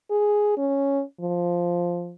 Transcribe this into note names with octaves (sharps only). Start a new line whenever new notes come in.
G#4
C#4
F3